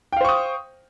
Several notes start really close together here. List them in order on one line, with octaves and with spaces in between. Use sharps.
G5 F5 C5 C#6 D#6